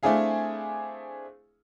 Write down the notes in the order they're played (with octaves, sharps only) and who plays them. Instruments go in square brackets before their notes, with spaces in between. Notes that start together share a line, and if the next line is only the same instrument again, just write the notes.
[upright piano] A3 C4 D4 E4 G#4 F5